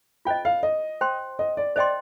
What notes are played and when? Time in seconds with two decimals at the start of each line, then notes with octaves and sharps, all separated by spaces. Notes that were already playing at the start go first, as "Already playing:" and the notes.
0.25 F4 C5 D#5 G5
0.45 F5
0.63 D#5
1.01 C5 G5 C6
1.39 D#5
1.57 D5
1.76 C5 D5 D#5 G5 C6